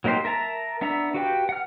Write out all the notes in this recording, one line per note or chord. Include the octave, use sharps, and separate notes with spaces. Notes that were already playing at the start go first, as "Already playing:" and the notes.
F#3 A#3 D#4 G4 C5
A#4 E5 A5 A#5
B3 D4 E5 A#5 E6
F#4 G4 B4 F5 G5
F#5 F6